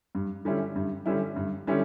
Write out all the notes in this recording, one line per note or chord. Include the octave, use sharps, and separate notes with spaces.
G2
D3 G3 C#4 E4
G2
D3 G3 C#4 E4
G2
D3 G3 C#4 E4